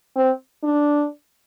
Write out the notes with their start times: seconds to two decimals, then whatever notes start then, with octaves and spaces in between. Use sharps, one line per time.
0.16 C4
0.63 D4